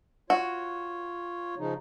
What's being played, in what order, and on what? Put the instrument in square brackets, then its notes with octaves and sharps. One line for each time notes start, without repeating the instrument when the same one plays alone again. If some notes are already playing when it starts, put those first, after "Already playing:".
[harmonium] F4 C#5 [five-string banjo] F#4
[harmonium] C#3 F3 D#4